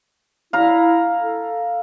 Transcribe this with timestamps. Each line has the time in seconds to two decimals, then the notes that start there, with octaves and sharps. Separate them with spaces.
0.53 E4 F5 A#5
1.20 A4